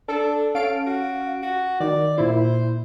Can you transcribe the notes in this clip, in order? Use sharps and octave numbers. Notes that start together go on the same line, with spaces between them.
D4 A4
C#4 A4 F5 D7
F#4
F#4
D#3 D5
A#2 E4 C5